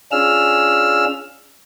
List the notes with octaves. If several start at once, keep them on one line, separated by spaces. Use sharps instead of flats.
C#4 D4 F4 G#4 E6 F6